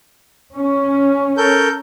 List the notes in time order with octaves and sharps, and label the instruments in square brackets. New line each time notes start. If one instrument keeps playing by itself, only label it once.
[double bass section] C#4
[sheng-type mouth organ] A4 A#4 G6